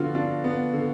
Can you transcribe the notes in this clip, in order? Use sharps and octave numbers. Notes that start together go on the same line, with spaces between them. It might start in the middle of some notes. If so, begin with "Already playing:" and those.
Already playing: D3 F3 B3 F4 F#4
D4 F4
B3
D3